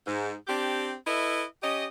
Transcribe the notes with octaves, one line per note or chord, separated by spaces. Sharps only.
G#2
C4 D4 G4
E4 A4 B4 D#5 E5
C#4 G4 D#5